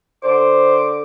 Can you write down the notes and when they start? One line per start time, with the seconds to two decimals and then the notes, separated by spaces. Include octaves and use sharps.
0.23 D3 C5 D6